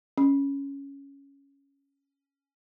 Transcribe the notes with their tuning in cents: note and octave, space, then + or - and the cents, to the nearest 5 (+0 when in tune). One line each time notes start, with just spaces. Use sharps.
C#4 +0